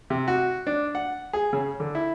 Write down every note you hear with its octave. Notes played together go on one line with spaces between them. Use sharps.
C3
F#4
D4
F#5
G#4
C#3
D3
E4